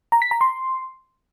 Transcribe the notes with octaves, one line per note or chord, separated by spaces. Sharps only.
A#5
B6
A#5
C6